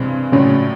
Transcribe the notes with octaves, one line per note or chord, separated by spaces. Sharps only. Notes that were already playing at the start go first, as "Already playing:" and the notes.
Already playing: G2 C3 E3 G#3 C4
A#1 A2 C#3 F#3 C#4